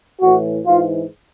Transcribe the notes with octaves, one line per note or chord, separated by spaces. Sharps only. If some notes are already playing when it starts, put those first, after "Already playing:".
A2 E3 F#4
G#2 E3 F4